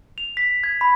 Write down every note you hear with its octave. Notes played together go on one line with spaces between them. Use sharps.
F7
B6
G#6
B5